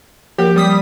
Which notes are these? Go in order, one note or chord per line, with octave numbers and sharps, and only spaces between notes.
F3 A#3 G4 A#4
G3 D#6 B6